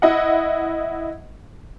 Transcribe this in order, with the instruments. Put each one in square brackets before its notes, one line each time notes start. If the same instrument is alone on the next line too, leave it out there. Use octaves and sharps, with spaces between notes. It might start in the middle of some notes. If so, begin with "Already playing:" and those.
[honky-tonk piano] E4 D#5 F#5